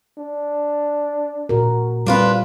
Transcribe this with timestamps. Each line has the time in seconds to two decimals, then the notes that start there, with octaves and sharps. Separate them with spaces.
0.18 D4
1.49 A#2 F#4 A#4
2.06 G3 C4 D4 F4 B4